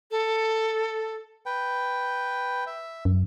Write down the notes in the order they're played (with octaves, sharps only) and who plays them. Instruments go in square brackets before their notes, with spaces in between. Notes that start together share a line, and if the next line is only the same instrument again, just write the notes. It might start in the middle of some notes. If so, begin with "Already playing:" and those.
[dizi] A4
[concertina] B4 G5
E5
[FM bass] F#2